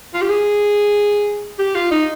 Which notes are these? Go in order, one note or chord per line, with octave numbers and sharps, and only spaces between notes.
F4
G4
G#4
G4
F4
D#4